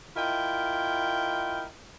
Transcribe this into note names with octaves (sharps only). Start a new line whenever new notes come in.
E4 F4 A#4 D#5 G5